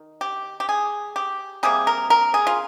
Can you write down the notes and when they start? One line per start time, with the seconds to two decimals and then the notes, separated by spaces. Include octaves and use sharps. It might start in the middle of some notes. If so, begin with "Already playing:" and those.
Already playing: D#3
0.21 G4
0.60 G4
0.69 G#4
1.16 G4
1.63 C3 G3 A#3 G#4
1.87 A#4
2.10 A#4
2.34 G#4
2.47 F4